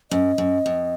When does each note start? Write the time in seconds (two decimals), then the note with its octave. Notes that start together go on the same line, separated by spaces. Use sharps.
0.11 F#2 D#5
0.38 F#2
0.66 F2